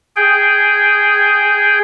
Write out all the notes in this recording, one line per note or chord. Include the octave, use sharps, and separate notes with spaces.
G#4 G5